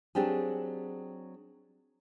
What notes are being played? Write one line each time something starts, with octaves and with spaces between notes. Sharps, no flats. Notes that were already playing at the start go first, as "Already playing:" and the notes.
F#3 C4 D4 G4 G#4